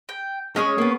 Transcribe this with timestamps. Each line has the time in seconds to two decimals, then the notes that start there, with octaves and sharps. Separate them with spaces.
0.09 G5
0.56 G#3 C#4 G#4 C#5
0.78 A#3 B3